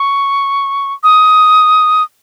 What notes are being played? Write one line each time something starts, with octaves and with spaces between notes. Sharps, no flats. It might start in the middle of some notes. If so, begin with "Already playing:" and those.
Already playing: C#6
D#6